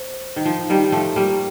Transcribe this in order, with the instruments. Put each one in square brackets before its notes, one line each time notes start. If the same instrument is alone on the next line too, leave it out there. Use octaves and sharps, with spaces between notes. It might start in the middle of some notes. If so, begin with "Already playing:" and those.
Already playing: [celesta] C5
[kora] D#3
F3
D#3 G3
F3 A3
G3 A#3